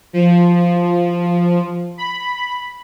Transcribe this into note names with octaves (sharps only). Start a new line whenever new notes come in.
F3
B5